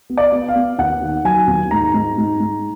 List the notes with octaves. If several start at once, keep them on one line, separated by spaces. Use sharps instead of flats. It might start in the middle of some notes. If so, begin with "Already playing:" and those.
B3
D5
B3
F5
B3
D#2 F#5
D#3
F#3 G#5
D#2
G#2 A#5
G#2
G#2
G#2